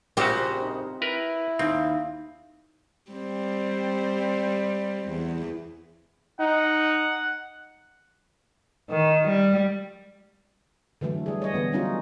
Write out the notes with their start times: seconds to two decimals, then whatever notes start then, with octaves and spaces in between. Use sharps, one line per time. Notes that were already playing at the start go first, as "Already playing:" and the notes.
0.17 A#1 C#3 C4 F#4 G4
0.61 D#4
1.02 E4 A#4 B4
1.59 D#2 C4
3.11 G3 C4
5.09 E2
6.40 D#4 F#5
8.90 D#3
9.28 G3
11.01 D3 E3 F#3 A3
11.26 G3 G#4
11.42 C#5 D#5
11.54 D3 E3 B3
11.72 F#3 G3 C#4 D#4 F4 F#4